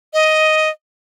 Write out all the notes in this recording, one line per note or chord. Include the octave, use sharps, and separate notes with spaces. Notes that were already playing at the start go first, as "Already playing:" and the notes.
D#5